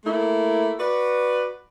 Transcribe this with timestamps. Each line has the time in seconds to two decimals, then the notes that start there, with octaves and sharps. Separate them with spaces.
0.05 A3 A#3 E4
0.79 F#4 B4 D5